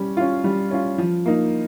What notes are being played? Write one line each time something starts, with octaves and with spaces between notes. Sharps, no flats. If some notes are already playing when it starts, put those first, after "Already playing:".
Already playing: G3 C#4
C#4 F4
G3
C#4 F4
F3
A#3 D#4